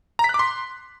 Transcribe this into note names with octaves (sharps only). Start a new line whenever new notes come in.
A#5
B6
F#6
D6
C6